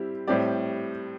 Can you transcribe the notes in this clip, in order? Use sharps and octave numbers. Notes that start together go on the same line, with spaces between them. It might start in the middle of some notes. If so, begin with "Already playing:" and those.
Already playing: G3 C4 E4 G4
A2 G3 C4 G4 D5